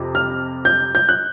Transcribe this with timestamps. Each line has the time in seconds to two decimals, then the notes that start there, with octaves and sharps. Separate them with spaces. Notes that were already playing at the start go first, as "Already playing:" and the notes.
Already playing: F2 C3
0.15 F6
0.65 G6
0.95 G6
1.09 F#6